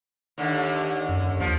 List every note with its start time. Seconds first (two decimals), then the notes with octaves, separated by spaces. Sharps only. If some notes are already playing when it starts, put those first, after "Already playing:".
0.38 D#2 D3
1.09 F#2
1.40 D#2 F3